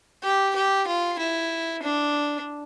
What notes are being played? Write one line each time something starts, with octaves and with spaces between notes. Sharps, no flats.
G4
G4
F4
E4
D4